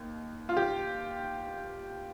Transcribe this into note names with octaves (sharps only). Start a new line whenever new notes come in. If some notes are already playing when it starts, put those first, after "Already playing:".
Already playing: D#2
F4
G4